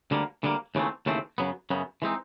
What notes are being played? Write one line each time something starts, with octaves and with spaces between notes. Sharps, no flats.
D2 D3 G3 A#3
D2 D3 G3 A#3
D#2 C#3 E3 A3 C4
D#2 C#3 E3 A3 C4
F#2 C#3 F#3 B3
F#2 C#3 F#3 B3
E3 G#3 C4 D#4